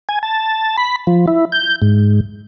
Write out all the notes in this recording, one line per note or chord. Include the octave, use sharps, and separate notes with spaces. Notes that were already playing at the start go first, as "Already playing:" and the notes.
G#5
A5
B5
F3
E4
G6
G#2